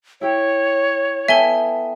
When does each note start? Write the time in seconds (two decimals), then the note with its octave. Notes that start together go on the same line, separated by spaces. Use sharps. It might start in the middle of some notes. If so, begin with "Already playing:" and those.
0.21 E4 G4 C#5
1.28 B3 A4 E5 G5 G#5 G7